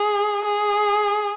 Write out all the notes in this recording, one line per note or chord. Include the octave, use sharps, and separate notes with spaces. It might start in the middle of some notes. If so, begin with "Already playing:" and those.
Already playing: G#4
G#4